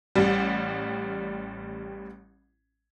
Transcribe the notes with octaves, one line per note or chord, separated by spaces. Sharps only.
A1 G3